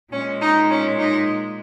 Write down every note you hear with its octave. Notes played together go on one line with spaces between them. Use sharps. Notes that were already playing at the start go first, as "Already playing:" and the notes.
A#2 G#3 C#4
D#4
C#4
D#4